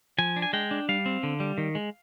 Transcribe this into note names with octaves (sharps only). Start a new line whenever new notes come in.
F3 G#5
D4
G#5
G#3 G5
D4
G3 F5
C4
D3
G3
D#3
G#3